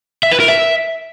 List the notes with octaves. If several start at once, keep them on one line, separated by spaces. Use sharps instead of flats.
E5
B4
A#4
E5